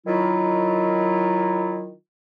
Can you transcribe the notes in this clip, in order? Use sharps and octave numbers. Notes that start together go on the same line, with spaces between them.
D#3 F#3 E4 F4